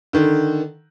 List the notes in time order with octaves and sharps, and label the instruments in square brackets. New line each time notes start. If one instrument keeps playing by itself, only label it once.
[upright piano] D3 D#3